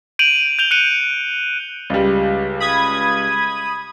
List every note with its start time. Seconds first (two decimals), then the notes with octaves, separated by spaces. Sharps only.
0.19 G6 D7 D#7 F7 F#7
0.59 G6 F7 G7
0.71 F#6 C#7 D#7
1.90 C#2 G3
2.60 B5 D#6 G#6